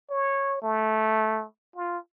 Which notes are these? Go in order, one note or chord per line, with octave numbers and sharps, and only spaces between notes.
C#5
A3
F4